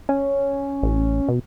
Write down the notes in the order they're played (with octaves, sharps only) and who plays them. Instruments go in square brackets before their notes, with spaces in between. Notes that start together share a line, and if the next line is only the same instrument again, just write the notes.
[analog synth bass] C#4
[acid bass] A1
B2